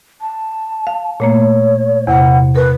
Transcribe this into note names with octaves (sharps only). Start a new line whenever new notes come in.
A5
F5
A#2 A3 A#3 C#5
E2 C3 F#5
A#4 B4